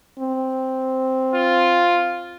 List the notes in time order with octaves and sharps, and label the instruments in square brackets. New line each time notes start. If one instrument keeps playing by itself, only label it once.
[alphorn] C4
[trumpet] F4